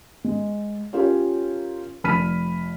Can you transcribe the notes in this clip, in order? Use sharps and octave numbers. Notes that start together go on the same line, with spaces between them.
G#3
C#4 F4 G4 A#4 C#5
F1 B5 F6 B6 D#7